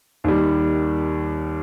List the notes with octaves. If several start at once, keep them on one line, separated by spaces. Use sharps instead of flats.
D#2 D#3 G3